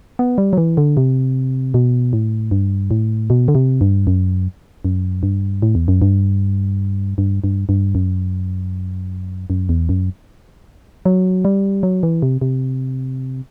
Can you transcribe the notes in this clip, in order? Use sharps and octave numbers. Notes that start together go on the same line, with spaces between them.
B3
G3
F#3
E3
D3
C3
B2
A2
G2
A2
B2
D3
C3
G2
F#2
F#2
G2
A2
E2
F#2
G2
G2
G2
G2
F#2
F#2
E2
F#2
F#3
G3
F#3
E3
C3
C3